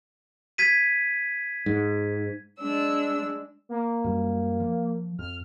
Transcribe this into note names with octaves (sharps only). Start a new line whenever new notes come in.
G#6 B6 D#7
G#2
G#3 D4 E6
A#3
F#2 G3
F3
F2 F6